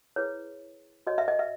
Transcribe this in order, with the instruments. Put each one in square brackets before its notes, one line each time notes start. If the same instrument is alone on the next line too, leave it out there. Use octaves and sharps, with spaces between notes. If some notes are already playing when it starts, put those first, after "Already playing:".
[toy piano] E4 G#4 B4 C#5
F#4 C#5 D#5
E5
D#5
E5